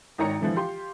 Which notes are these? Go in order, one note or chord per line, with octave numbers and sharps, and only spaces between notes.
G#1 D#3 D#4 C#5 A#5 C#7
D3 E3 F3
F4 G4 C6